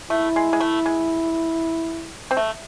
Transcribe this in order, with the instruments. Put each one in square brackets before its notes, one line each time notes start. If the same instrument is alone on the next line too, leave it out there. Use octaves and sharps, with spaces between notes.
[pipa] A3 [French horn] E4
[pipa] G#3
G#3
A3
G#3
C4
A3